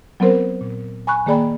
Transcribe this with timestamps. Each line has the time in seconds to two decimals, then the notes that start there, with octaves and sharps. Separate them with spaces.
0.20 F#3 B3 C4 A#4 C5
0.61 A#2
1.07 G#5 B5 C#6 F#6
1.26 D#3 A#3 G#4 D5 G5 B5